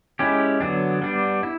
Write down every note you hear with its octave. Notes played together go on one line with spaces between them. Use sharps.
G#3 C#4 E4 G4
D3 F#3 B3 D4
G3 B3 D4
E4